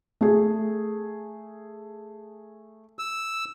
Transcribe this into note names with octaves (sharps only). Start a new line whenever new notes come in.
A3 G#4
E6